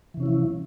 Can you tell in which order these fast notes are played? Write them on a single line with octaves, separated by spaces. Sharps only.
E3 C3 C#4 E4 F3